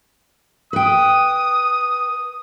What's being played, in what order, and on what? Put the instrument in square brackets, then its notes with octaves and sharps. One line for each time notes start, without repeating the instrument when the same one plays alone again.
[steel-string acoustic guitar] B4 G5 [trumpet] D#6